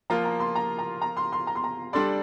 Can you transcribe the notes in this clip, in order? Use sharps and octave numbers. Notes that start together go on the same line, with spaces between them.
F3 A#3 F4 A#4 A#5
A#5
C6
A#5
A#5
A#5
C6
C6
A#5
C6
A#5
G3 D4 A4 D5 C6